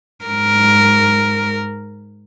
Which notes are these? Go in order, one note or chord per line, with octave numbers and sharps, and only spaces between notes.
G#2 A#4